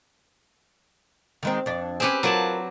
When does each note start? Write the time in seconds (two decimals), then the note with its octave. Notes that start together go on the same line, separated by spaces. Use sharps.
1.43 D#3 G#3 C4
1.66 F2 D4
2.00 C4 C#4 G4 G#4 B4
2.23 F#3 F4 F#4 A#4 D5 A5